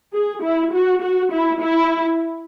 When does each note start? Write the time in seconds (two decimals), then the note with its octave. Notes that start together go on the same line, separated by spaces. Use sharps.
0.14 G#4
0.43 E4
0.73 F#4
1.02 F#4
1.32 E4
1.61 E4